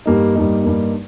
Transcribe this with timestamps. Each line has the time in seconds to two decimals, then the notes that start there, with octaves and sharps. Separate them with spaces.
0.06 G2 G3 A#3 D#4
0.35 G2 G3 A#3 D#4
0.63 G2 G3 A#3 D#4